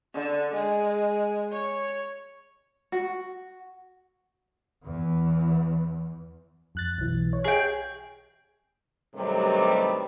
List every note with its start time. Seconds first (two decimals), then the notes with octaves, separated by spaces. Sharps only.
0.14 D3
0.54 G#3
1.52 C#5
2.92 F#4
4.84 E2 E3
6.75 F2 F#6 A6
6.98 B1 E3
7.33 C#5
7.44 G#4 G5
9.15 G2 C3 D#3 F#3 G3 A3